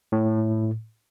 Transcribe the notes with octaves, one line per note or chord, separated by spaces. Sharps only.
A2